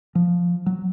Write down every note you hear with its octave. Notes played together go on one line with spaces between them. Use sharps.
F3
F#3